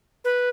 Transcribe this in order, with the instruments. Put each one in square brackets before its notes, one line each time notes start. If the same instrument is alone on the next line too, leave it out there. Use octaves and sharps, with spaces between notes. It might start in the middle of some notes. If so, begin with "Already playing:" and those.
[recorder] B4